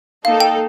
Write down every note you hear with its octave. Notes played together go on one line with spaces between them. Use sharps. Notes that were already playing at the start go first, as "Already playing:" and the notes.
A#3 D#4 A4 F5
G5